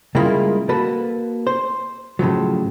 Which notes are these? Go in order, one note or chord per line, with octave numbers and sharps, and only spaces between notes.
C#3 G3 G#3 A#3 E4 F4
A#3 F#4 A4 B4
C5
A2 C#3 F3 F#3